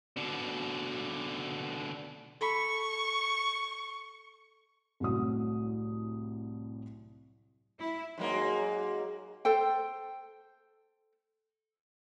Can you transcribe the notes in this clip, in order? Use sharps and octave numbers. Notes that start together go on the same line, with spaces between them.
B2 D3
A4 B5 C#6
C2 A2 F#3 D#6
E4
G#2 F#3 A#3
A4 C5 G5